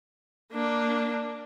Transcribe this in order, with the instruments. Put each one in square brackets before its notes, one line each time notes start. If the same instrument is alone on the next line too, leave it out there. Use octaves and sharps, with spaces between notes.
[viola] A#3 D4